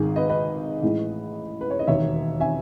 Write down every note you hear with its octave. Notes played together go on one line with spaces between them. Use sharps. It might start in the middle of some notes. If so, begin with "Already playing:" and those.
Already playing: G#1 G#2 D#3 G#3 G#4
B4 D#5
B4 D#5
A1 A2 E3 G#3
B4
C#5
D#5
E1 D#2 D#3 C#5 E5
E5 G#5